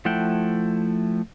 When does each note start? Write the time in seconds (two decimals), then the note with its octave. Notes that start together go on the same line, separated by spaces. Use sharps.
0.05 F3 A3 E4 F#5 G5